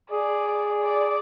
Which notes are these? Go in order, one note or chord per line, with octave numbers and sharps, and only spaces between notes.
G#4 D5
D5